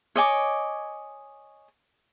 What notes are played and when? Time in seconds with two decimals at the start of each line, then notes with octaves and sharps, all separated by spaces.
0.16 C#5 D#5 G#5 D6